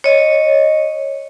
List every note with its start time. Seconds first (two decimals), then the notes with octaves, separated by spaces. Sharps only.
0.04 C#5 D#5